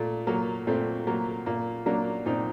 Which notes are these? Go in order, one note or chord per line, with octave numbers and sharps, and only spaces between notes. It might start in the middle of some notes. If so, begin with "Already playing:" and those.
Already playing: A#2 A3
F#3 A#3
A#2 A3 C4
F#3 A#3
A#2 A#3
F#3 A#3 D4
A#2 C4 D#4